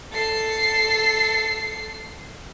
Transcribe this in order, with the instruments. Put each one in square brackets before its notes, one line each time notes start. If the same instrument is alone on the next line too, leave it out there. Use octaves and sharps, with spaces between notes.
[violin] A4 C7